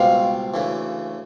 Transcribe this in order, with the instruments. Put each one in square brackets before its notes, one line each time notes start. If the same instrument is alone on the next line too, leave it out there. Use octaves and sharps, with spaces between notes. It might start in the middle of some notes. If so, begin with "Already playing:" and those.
Already playing: [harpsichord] C#2 B2 G3 C4 [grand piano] F5
[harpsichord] D2 C#3 E3